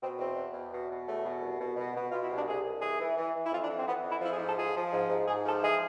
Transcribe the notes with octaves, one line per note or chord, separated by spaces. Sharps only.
B2 C4
E2 C4
B2
E2
B2
B2
E2 A3
B2
C2
B2
B2
B2
B2 F4
E4
C2
D4
C2 G#4
C2
E3 G#4
E3
E3
E3
E4
F2 F4
D4
E3
C4
E3 B3
F2
E4
F3 E4
G#4
G#2
A4
F3 G#4
F3
G#2
G#2
G#2 G#4
F3 A4
E3 G#4